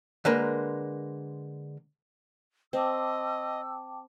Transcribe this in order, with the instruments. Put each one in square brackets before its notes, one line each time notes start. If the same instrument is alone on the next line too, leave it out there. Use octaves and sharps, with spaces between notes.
[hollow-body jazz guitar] D3 G#3 A#3 A#4 B4
[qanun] C4 [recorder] D#5 [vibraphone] G5 A5 D6 [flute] E6